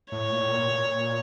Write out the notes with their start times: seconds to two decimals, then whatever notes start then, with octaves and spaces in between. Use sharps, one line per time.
0.12 A2 C#5
0.31 A#2
0.42 A2
0.51 A#2
0.70 A#2